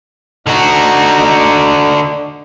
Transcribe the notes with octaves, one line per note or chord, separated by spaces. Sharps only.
D3 D#4 F#4